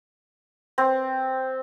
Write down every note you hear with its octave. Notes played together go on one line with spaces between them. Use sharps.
C4